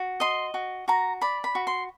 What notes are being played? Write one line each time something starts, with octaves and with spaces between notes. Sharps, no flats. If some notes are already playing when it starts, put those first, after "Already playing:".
Already playing: F#4
D#5 C6
F#4
F#4 A#5
D5 B5
B5
F#4
C6